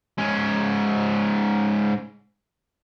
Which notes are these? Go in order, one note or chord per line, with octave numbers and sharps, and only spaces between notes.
G#2 C#4